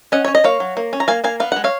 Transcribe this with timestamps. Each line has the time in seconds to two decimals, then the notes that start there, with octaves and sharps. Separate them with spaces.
0.12 C#4 D#5 F#5
0.25 C#4 C#5
0.35 D#5
0.44 A#3 C#5 F5
0.60 F#3
0.77 A#3
0.93 C#4
1.00 A#5
1.08 A#3 F5 G#5
1.24 A#3 F5 G#5
1.40 B3 F5
1.52 G#3 F#5
1.64 C#5 F5